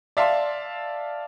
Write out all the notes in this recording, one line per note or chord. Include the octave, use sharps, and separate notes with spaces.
D5 E5 F5 A5 C6